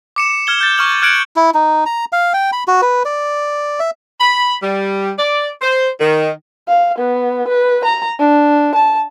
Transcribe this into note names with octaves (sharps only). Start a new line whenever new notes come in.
D6 C#7 E7
F6 G#6 G7
G6 A6
C#6 F6 F#7
F6 F#6 G#6 C#7 D7 F#7
E4
D#4
A#5
F5
G5
B5
F#4
B4
D5
E5
B5
G3
D5
C5
D#3
F5
B3
B4
A#5
D4
A5